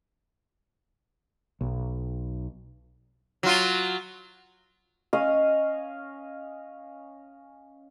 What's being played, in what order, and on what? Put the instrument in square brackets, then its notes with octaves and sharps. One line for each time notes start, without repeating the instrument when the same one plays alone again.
[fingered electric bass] B1
[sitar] F#3 F4
[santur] C#4 D#5 F5 D#6